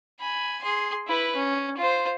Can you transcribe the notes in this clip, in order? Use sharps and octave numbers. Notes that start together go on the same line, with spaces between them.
G#5 B5
G#4 C6
E4 B4
C#4
F4 C5